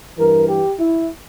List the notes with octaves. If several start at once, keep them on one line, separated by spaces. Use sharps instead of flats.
G2 E3 A#4
G4
E4